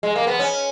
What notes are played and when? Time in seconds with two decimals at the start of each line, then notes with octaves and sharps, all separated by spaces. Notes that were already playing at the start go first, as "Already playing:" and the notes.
0.03 G#3
0.16 A#3
0.27 B3
0.39 C#4